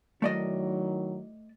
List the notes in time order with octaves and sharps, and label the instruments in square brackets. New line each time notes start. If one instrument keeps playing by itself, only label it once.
[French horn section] D#3 F#3 E4 [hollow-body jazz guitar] A3 D5 D#5